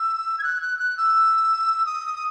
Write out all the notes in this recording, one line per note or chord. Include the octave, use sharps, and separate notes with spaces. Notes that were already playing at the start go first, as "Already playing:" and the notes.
Already playing: E6
G#6
F#6
F#6
F#6
E6
D#6